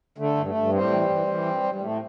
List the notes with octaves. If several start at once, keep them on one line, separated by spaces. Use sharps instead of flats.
D3 A3
G2
A3
G2
A2 G3 C4
E3
E3
E3
G2
G2
G3
A2 A3